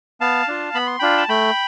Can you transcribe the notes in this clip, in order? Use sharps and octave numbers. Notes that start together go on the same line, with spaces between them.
B3 F5 A5
D4 F4
B3 B5
C6
D4 F4 G5 B5
A5
A3 G5 B5